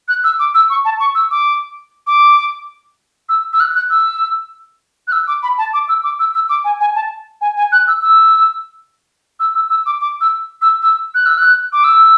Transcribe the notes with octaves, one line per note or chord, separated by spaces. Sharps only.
F#6
E6
D6
E6
C#6
A5
C#6
E6
D6
D6
E6
E6
F#6
F#6
E6
F#6
E6
D6
B5
A5
D6
E6
D6
E6
E6
D6
G#5
G#5
A5
G#5
G#5
F#6
E6
E6
E6
E6
E6
D6
D6
E6
E6
E6
F#6
E6
F#6
D6
E6